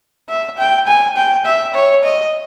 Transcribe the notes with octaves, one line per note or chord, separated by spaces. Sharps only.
E5
G5
G#5
G5
E5
C#5
D#5